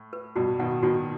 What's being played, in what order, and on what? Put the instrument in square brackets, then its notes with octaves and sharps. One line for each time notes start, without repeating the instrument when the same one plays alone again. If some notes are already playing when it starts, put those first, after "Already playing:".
Already playing: [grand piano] A2
[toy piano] B4
[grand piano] G2 B2 [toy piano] F#4
[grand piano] B2 D#3 [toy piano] F#5
[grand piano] B2 D#3 [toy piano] F#4